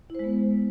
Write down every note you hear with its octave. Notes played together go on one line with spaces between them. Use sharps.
G#3 B3 E4 C5